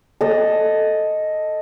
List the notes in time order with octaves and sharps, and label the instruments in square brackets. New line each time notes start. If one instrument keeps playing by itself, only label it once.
[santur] A4 D#5